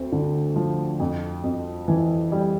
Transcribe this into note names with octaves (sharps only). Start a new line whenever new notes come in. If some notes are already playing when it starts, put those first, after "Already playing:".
Already playing: D2 C4
D3
F3
F2
F2
E3
G3